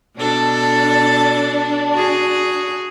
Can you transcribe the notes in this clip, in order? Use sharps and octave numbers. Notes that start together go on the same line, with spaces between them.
B2 D4 A4
F#4 G#4